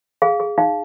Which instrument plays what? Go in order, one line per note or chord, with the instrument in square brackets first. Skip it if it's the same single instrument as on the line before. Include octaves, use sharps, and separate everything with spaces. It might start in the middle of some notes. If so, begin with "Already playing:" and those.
[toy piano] G#4 F5
G#4
D#4 F5